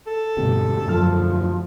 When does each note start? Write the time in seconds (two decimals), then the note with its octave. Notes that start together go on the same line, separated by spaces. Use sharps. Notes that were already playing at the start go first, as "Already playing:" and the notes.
0.07 A4
0.37 E1 D2 G2 B2 C4 G4
0.88 F#2 F3 A5 F6